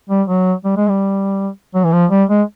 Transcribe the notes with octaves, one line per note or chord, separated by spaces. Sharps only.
G3
F#3
G3
G#3
G3
F#3
E3
F3
G3
G#3